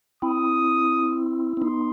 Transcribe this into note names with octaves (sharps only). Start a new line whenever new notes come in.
C4 E4 D#6
C4
B3 D#4 C6